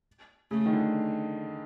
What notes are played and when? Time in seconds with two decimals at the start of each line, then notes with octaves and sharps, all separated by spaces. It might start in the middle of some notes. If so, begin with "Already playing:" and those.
0.51 C#3 A3
0.66 D#3
0.73 D3